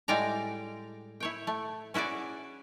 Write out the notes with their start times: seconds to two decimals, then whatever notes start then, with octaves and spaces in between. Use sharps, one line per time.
0.08 A2 G3 G#3 D5 G5 A#5
1.20 E4 C#5 G5
1.47 A3
1.94 C#4 E4 F#4 G#4 D5